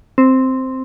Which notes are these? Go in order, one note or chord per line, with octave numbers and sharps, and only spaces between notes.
C4